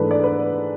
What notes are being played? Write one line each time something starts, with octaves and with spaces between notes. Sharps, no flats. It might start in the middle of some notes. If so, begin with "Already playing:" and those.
Already playing: G#2 E3 A3 D4 A4 B4
D5
B4